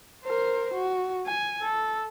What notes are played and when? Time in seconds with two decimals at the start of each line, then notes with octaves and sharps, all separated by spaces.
0.25 A#4 C5
0.74 F#4
1.26 G#5
1.62 A4